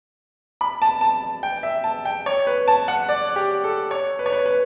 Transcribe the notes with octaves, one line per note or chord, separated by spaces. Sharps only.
B5
A5
A5
G5
E5
A5
G5
C#5
B4
A5
F#5
D5
G4
A4
C#5
B4
C#5
B4
B4